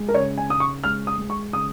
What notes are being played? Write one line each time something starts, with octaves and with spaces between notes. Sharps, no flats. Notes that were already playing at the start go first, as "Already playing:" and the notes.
Already playing: G#3
A#4
C#3 C#5
G#5
C#3 D#6
C#6
G#3 F6
D#6
G#3
C#6
C#3 D#6